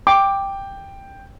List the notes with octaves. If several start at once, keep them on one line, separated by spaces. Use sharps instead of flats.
G5 D6